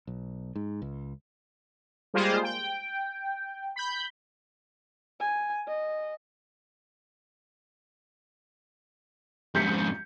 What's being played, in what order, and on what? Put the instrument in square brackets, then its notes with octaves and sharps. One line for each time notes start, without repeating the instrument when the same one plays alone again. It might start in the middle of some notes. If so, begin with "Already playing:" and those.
[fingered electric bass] B1
G#2
C#2
[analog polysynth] G3 G#3 A#3 F4 G#4 C5
G5
B5 G6
[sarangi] G#5
D#5
[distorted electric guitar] F2 G#2 [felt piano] G6 B6 C#7